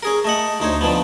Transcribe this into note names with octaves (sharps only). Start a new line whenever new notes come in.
C#4 G#4 A#4
A3 D#5 F#5
D2 D#4 C5 C#5
D3 D#3 F3 B3